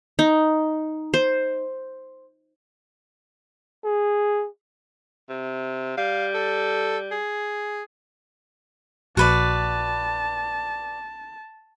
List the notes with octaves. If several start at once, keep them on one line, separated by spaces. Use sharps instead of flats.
D#4
C5
G#4
C3
G3 F5
A4
G#4
A#1 F#4 B4 D5 A5